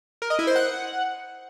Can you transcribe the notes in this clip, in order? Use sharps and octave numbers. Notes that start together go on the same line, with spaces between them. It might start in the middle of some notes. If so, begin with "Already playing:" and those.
A#4
D#5
E4
C5
F#5